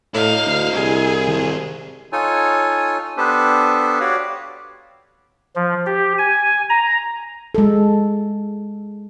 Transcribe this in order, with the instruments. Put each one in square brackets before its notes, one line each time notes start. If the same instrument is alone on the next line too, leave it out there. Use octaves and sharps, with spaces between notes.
[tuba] A2 [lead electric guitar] E4 D#5 [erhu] F5
[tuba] D2
[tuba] C2 [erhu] G#4
[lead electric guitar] D#3 C4
[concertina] D#4 F4 A4 C#5 G#5
B3 D4 G4 A4 B4 C5
F#4 G4 C#5 D5 F5
[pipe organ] F3
G4
G#5
A#5
[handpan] G#3 A4